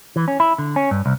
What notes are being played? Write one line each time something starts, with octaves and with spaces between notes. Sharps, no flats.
E3
C#4
E4
D3
C#4
G2
C2